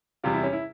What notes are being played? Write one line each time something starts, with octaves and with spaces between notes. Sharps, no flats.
E2 C3 G3 F4
E4
C#4
E4